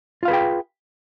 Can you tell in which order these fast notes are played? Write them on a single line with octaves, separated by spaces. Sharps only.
F4 F5 B4 G#4 G5